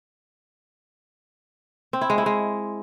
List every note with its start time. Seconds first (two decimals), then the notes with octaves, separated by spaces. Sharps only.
1.93 C4
2.01 E4
2.10 G#3
2.18 E4
2.26 G#3